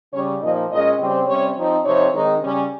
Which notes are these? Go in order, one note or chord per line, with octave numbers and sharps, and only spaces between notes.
C#3 G3 C#4 C#5
A#2 F3 A#3 D#4 D#5
A#2 G#3 C#4 D#5
C#3 G3 C4
C3 G3 C#4 C#5
F3 C4 D#4
C3 F3 C4 D#4 C#5
D#3 G#3 C4 D#4
C#3 G3 C#4